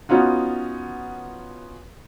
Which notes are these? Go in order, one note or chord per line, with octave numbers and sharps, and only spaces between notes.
B3 C#4 D#4 F4 F#4